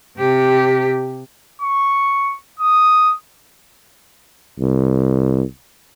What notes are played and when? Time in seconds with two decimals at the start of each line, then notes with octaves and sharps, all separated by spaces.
0.18 C3 G4
1.61 C#6
2.59 D#6
4.60 C2